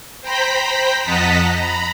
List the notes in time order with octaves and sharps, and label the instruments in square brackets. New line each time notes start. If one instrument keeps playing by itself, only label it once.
[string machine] C5 G5 A#5 B5 B6
F2 D#5 F#5 A5 A#5 B6
A#5 B5